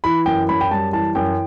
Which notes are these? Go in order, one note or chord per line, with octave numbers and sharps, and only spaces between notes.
E3 B5
F#2 G5
F#2 B5
G5
G3 A5
E3 A5
F#2 G5